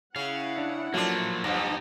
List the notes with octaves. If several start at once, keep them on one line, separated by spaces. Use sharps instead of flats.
C#3 C#4 E4 F5 F#5
D4
F3 F#3 A3 A#3 D4 F4
G2 F3 D#4 G4